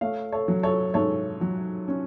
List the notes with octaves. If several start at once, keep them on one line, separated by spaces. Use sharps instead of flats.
A3 C#5 F5
A4 C#5
F#3
A4 C#5
G#2 A4 C#5
F#3
C#4